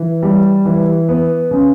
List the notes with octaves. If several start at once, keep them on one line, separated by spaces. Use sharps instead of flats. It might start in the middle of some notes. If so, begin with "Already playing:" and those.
Already playing: E3
G3
E3
B3
C#3